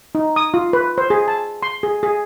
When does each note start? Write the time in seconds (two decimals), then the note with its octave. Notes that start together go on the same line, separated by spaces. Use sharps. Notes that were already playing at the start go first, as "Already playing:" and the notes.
0.15 D#4
0.36 D#6
0.54 F4
0.73 B4
0.98 C5
1.10 G#4
1.28 A5
1.63 C6
1.83 G#4
2.03 G#4